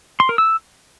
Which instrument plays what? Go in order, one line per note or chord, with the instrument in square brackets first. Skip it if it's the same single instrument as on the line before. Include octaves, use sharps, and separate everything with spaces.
[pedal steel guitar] C6
A#4
E6